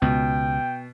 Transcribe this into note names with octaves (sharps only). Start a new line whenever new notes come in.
C#2 B2 G5